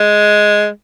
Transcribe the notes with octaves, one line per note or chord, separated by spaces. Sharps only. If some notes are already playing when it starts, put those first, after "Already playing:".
Already playing: G#3